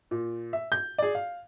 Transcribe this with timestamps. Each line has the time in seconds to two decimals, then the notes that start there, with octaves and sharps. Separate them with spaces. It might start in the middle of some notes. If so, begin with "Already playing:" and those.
0.11 A#2
0.53 E5
0.72 G6
0.98 G#4 D5
1.15 F5